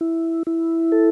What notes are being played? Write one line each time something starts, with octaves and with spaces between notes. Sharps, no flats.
E4
E4
A4